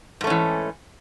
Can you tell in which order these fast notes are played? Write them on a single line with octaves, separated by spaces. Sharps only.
G#2 A3 C#4 E3